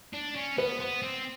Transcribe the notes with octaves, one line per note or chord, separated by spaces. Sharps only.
D4
C#4
B3 B4
B3 C5
C4